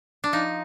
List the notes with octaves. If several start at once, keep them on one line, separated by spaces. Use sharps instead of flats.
D4
F3 D#4